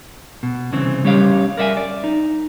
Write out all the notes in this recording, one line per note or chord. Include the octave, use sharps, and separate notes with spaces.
B2
C2 C#3 E3 C4
G3 C#4 G4 C#5 F5
A#4 D5 E5 F5 G#5
D5
D#4